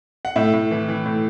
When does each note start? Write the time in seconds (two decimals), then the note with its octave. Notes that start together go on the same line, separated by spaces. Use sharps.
0.25 F#5
0.36 A2 E5
0.53 A2
0.71 E3
0.88 E3
1.06 A2